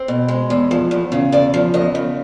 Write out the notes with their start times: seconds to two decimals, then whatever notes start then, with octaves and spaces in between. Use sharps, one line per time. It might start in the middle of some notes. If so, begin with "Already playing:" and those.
Already playing: C4
0.08 B2
0.28 G#3
0.50 E2
0.71 F3
0.91 E2
1.12 C#3
1.32 E2 D5
1.54 F3
1.74 E2 D#5
1.95 C#3